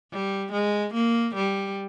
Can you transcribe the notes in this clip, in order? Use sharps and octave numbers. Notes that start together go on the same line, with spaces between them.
G3
G#3
A#3
G3